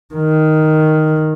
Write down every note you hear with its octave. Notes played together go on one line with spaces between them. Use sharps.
D#3